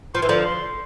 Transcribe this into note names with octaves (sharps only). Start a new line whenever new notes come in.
F3 C6
E3
D3 F3
C6